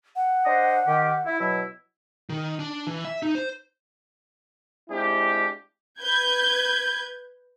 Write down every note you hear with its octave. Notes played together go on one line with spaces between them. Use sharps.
F#5
D4 C5 D#5
D#3 G4
E4
B2 F#3 E4
D#3
D4
E3
E5
D#4
C5
G#3 C4 D4 E4 F4 G4
B4 G6 G#6